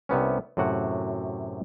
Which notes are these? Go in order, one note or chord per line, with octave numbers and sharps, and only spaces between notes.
C2 C3 B3 C#4
F#2 A2 C3 F#4 F#5